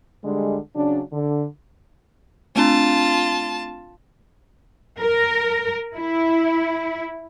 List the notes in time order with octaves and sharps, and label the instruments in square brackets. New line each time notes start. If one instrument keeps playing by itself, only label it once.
[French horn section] D3 G3 G#3
C#3 F#3 D4
D3
[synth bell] A3 C4 D4 [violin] F4 A5
[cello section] A#4
E4